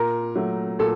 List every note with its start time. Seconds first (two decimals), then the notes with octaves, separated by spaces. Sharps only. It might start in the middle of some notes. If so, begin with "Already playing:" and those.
Already playing: A#2 A#4
0.36 F#3 A3
0.79 A#2 A4